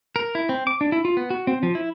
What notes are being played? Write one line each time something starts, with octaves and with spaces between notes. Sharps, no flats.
A#4
E4
C4
D6
D4
E4
F4
B3
F#4
C4
F3
E4